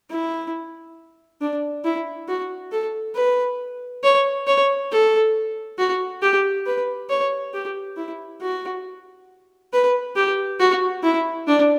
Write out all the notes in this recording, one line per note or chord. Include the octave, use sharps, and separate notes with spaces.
E4
D4
E4
F#4
A4
B4
C#5
C#5
A4
F#4
G4
B4
C#5
G4
E4
F#4
B4
G4
F#4
E4
D4